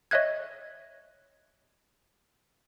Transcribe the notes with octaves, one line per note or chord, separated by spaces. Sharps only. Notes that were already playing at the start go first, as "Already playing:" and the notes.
C#5 D#5 E5 F#6 G#6